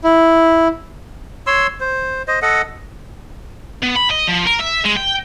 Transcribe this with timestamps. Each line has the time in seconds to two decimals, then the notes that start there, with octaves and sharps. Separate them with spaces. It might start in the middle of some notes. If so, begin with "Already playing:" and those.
0.04 E4
1.47 C#5 C6 E6
1.80 C5
2.28 C5 D#5
2.42 A4 D#5 F#5
3.83 B3
3.96 B5
4.11 D#5
4.29 F3
4.47 A#4
4.60 E5
4.86 G#3
4.97 G5